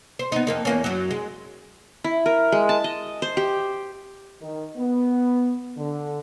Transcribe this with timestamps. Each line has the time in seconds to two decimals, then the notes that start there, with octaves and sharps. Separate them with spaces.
0.19 C5
0.32 B3 D#4
0.47 F2 A#3 D#4
0.65 E2 A#3 C#4
0.84 F#2 F#3
1.11 G#3
2.04 E4
2.26 A#4
2.52 G#3
2.69 A5
2.84 D#5
3.22 C5
3.37 G4
4.42 D#3
4.77 B3
5.77 D3